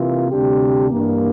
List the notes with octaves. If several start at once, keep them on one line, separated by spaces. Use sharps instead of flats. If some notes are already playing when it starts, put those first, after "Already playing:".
Already playing: C3 E3 A#3 F4
D2 C3 G3 D4 G4
G2 E3 A#3